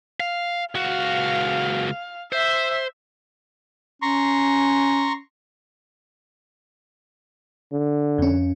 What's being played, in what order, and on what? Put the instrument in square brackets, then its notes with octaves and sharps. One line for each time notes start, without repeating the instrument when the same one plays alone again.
[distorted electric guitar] F5
[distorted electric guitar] C#2 F#4 [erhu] F5
[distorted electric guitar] C5 [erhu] E5
[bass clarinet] C#4 [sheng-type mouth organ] A#5 C6 C#6
[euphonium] D3
[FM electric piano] F2 C#4